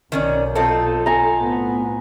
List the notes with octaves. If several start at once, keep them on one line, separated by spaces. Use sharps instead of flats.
B1 B2 D#3 C#4 D5
C4 D#4 F4 A4
G#5 A#5
A2 B3